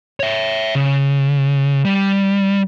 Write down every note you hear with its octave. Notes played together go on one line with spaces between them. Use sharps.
C#5 E5
C#3
G3